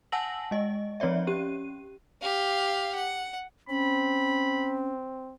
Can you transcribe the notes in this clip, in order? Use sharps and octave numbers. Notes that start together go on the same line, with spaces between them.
F#5 G#5 A5 E6 A#6 F#7
G#3 D#5
F3 C4 C#5 D5 E5
C#4 G4 D#7
G4 F5
F#5
C4 C#4 B5